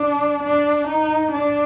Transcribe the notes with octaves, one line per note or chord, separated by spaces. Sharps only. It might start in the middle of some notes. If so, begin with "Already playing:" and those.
Already playing: D4
D4
D#4
D4